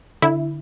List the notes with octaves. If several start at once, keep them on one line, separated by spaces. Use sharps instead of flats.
D3 E4